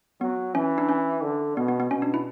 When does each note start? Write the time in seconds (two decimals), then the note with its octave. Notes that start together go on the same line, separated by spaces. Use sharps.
0.21 F#3 B3
0.55 E3 C#4
0.78 D4
0.89 C#4
1.23 D3
1.57 B2 B3
1.68 B3
1.80 B3
1.91 B2 C#4
2.02 D4
2.14 E4